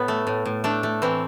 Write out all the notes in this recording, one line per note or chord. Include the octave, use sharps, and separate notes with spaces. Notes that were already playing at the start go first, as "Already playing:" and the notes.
Already playing: A2 B3
A3
A2
A2
A3 D4
A3
E3 C4